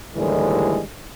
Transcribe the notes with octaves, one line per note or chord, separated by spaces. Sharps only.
D#2 A2 D3 E3 G3 G#3